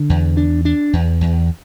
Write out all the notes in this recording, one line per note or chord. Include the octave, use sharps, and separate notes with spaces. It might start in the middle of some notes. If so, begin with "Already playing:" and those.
Already playing: D3
E2
D4
D4
E2
E2